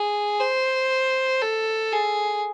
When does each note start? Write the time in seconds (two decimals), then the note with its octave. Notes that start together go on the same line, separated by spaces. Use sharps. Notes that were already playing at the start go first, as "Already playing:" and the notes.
Already playing: G#4
0.40 C5
1.42 A4
1.92 G#4